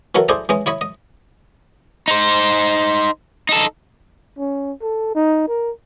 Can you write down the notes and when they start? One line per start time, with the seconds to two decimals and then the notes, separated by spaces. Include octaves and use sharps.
0.15 E3 F#3 F#4 A4 A#4
0.29 E4 G#4 A4 C5 D5 D#5
0.49 E3 G#3 C#4 D#5
0.66 E4 C#5 D#5 B5
0.81 D#5
2.08 D#4 C5
3.49 D#4 A4
4.38 C#4
4.82 A4
5.15 D#4
5.48 A#4